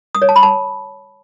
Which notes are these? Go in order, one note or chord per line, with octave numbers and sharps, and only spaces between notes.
D#6
C#5
A5
B5
A5